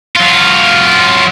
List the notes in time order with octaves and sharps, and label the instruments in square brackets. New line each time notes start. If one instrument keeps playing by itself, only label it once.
[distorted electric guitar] F#3 F4